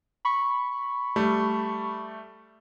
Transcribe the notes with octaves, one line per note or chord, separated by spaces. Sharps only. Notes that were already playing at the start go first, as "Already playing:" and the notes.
B5 C#6
G3 A3